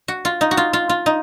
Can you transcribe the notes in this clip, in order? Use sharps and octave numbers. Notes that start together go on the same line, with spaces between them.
F#4
F4
D#4
F#4
F4
F4
F4
D#4